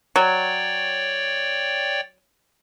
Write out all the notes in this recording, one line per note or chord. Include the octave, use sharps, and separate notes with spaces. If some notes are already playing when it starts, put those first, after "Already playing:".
F#3 C#5 D5 G5